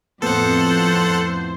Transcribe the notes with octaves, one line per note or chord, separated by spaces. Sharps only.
F2 A2 B3 A4 C5 F#5